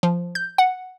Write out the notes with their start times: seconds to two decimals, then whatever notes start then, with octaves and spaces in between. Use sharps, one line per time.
0.03 F3
0.35 G6
0.58 F#5